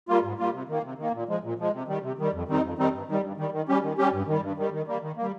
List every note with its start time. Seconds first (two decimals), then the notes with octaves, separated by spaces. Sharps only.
0.09 G3 A#3 F4
0.23 G#2
0.39 G3 A#3 F4
0.53 C3
0.69 D#3 A#3
0.84 C3
0.98 D#3 A#3
1.14 A#2
1.29 F3 G#3
1.44 A#2
1.59 F3 G#3
1.73 C3
1.88 D#3 G3
2.03 C3
2.19 D#3 G3
2.33 F2
2.48 D#3 G3 C4 D#4
2.63 F2
2.78 D#3 G3 C4 D#4
2.93 G2
3.08 D#3 G3
3.23 G2
3.38 D#3 G3
3.52 D#3
3.68 G3 C#4 G4
3.83 D#3
3.98 G3 C#4 G4
4.13 G2
4.27 D#3 G3
4.43 G2
4.57 D#3 G3
4.72 D#3
4.87 G3 A#3
5.02 D#3
5.17 G3 A#3